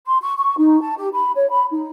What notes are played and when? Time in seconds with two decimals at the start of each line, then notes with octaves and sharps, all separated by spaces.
0.05 C6
0.21 C#6
0.37 C#6
0.57 D#4
0.80 A5
0.96 G4
1.13 B5
1.35 C#5
1.49 B5
1.71 D#4